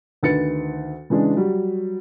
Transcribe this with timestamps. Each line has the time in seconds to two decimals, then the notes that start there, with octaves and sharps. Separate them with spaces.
0.23 D2 D#3 B4 A6 C#7
1.10 C#3 E3 G#3 D4
1.37 F#3 G3